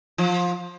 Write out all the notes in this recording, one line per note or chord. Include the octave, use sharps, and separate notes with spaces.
F3